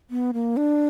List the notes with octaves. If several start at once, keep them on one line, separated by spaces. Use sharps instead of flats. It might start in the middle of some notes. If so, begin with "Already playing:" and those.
B3
A#3
D4